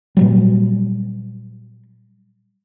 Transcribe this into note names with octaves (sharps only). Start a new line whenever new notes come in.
A#2 F#3 G3